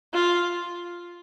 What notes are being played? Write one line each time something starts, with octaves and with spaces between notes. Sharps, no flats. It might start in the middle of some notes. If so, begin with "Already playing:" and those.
F4